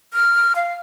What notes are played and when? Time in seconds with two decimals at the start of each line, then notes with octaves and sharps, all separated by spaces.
0.13 F6
0.56 F5